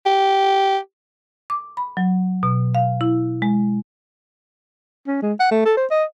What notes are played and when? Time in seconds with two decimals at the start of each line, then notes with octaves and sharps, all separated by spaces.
0.06 G4
1.50 D6
1.77 B5
1.97 F#3
2.43 B2
2.75 F5
3.01 E4
3.42 G#3
5.07 C#4
5.22 G#3
5.40 F#5
5.51 A3
5.65 A4
5.77 C5
5.91 D#5